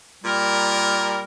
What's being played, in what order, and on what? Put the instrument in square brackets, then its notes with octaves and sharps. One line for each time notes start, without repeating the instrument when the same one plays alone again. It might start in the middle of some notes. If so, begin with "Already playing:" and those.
[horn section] A#2 A#4 [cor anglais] G3